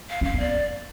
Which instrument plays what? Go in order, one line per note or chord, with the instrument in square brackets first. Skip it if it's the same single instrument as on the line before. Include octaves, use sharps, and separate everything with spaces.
[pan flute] F5
[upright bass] C#4 [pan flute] F5
[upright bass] B3
[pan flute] D5